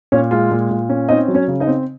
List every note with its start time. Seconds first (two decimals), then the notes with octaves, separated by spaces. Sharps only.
0.12 A#2 C#4 C#5
0.31 G#3 F4 F5
0.51 A#2
0.71 A#2
0.89 C#4
1.09 C4 D#4 D#5
1.28 F#3
1.34 C#4 C#5
1.48 C#3
1.60 D#4 D#5
1.67 C4